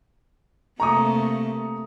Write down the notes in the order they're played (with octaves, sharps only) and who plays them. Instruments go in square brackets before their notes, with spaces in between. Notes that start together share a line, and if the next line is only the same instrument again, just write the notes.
[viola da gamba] C3 A3 A#3 [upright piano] A#5 C#6 D#6